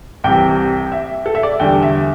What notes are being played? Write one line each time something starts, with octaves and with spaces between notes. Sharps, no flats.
C2 C3 E3 G3 G5
E5
A4
E5
D5
E2 D3 G3 G5
E5